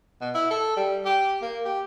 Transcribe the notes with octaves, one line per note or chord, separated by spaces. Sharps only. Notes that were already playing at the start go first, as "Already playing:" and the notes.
B2
E4
A4
G3
G4
A#3
G4